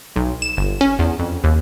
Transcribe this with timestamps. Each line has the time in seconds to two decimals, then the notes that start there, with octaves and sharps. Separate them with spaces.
0.16 B1
0.42 E7
0.57 G1
0.81 C#4
0.99 E2
1.19 F2
1.44 D#2